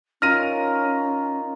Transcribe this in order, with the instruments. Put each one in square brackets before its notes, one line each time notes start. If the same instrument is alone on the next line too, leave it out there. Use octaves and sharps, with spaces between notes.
[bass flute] C#4 [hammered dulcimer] D#4 F4 A#4 [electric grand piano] F6 A#6 D#7